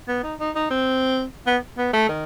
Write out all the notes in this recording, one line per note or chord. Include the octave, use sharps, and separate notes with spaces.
B3
D#4
D#4
D#4
C4
B3
B3
A3
D#3